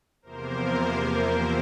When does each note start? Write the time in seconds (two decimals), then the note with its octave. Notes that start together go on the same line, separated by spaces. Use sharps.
0.22 E2 C3 F3 A#3 A#4 C5
0.98 A#4 C5